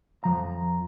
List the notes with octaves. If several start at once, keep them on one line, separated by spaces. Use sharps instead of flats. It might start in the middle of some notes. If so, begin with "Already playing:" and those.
F2 F3 A#5